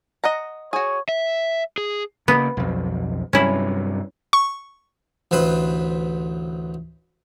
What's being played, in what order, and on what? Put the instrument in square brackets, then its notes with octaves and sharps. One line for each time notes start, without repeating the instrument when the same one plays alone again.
[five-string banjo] D#5 F#5 A#5
[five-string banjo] F#4 G#4 [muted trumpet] C#5
[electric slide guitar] E5
G#4
[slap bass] C#3 A#3 [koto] B3
[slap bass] B1 F2
[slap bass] G2 C3 F#3 [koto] C#4 E4
[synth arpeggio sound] C#6
[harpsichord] A1 D2 B4 C5 B5